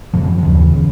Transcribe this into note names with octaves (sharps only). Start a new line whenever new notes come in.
F#2 C#3 F3
D#2 C#3 E3
C#3